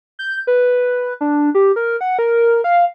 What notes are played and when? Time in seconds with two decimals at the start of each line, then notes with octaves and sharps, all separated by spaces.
0.19 G6
0.47 B4
1.21 D4
1.55 G4
1.76 A#4
2.01 F#5
2.19 A#4
2.64 F5